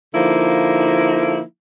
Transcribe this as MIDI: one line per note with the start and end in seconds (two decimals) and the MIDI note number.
0.15 1.41 50
0.15 1.41 53
0.15 1.41 58
0.15 1.41 63
0.15 1.41 64